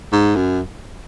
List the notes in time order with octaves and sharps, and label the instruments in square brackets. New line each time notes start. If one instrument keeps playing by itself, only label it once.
[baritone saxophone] G#2
F#2